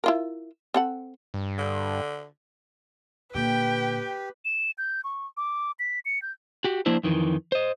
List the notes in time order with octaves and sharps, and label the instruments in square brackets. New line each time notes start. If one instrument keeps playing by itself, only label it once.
[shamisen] E4 F4 A#4
C4 A4 F#5
[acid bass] G2
[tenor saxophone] D3
[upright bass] A#2 D3 [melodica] G4 [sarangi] B4 [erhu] G5
[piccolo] E7
G6
C#6
D6
B6
C#7
G6
[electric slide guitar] F#4 G4
F3 A#3 D4 E4 C5
F2 D#3 E3
C5 D#5